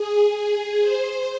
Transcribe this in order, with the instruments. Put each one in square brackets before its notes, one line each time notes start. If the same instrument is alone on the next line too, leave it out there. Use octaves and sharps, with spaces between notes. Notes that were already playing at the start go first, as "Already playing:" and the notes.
Already playing: [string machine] G#4
G#4
C5